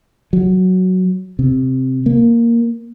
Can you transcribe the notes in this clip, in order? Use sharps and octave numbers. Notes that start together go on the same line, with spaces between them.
F#3
C3
A#3